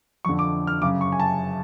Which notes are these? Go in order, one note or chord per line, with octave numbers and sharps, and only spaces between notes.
F2 D3 C#6
D6
F6
F#2 C#3 D6
C#6
G#5
A5